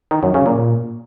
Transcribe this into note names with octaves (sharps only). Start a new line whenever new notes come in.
D#3
F#2
C#3
A#2